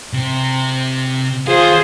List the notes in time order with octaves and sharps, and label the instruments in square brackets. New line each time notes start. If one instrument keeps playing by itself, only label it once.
[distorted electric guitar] C3
[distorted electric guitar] D#2 F5 [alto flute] F4 [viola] G#4 C5